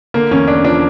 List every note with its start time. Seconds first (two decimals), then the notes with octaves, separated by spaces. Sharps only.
0.14 D3 A#3
0.31 E2 C#4
0.48 E1 D4
0.64 F3 D4